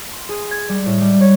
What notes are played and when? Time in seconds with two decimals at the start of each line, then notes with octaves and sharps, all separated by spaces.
0.13 C6
0.29 G#4
0.51 G#6
0.69 G3
0.86 A2
1.01 G3
1.21 C#5